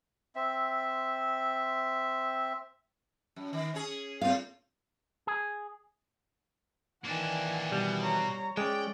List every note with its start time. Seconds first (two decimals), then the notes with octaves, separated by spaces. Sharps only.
0.35 C4 E5
3.36 F#2
3.53 D#3
3.74 C#4 G#4
4.21 A2 C4 F4 F5
5.27 G#4
7.04 D#3 E3 A#3 D4 F#5 G#5
7.72 B2 G3
8.02 C#5 A#5
8.57 G#3 C#4 D5 G5